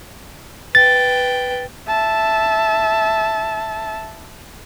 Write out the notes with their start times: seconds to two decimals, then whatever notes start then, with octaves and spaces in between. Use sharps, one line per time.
0.75 B4 G5 A6
1.88 E5 A5